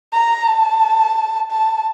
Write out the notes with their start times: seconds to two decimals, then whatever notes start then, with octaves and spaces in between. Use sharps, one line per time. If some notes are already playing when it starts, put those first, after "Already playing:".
0.13 A#5
0.47 A5
1.51 A5